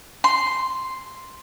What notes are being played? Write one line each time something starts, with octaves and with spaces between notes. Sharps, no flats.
C6